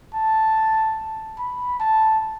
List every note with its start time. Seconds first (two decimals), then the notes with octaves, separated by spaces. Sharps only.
0.14 A5
1.39 B5
1.80 A5